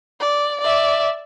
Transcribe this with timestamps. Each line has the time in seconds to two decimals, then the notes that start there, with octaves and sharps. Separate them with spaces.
0.20 D5
0.61 D5 E5